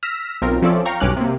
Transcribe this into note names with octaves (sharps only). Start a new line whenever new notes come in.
E6 F6 A#6 B6
B1 C4 F4 A#4
F3 C4 C#4 A4 D5 E5
F5 G5 A#5 C#6
B1 G2 C#4 D6 F6 F#6
C3 A#3